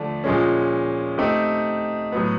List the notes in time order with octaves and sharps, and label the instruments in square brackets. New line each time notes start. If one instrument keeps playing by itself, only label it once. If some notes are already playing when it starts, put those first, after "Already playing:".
Already playing: [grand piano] D3 F3 A3 D4
A#2 F3 G#3 C#4
A3 C4 D#4 G4
A2 F#3 B3